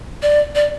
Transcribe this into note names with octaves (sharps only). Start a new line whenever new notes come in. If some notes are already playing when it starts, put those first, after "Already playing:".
D5
D5